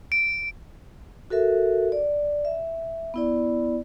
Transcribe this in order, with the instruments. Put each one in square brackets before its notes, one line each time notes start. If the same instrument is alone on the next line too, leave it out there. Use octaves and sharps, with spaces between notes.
[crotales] D7
[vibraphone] F#4 A4 A#4 E5
D5
E5
B3 E4 D5